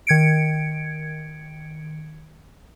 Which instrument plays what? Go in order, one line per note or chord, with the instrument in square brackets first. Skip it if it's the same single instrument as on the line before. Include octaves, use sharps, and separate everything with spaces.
[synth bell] D#3 G#6 C#7 D7